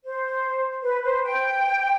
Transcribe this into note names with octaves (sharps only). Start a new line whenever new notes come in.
C5
B4
C5
G5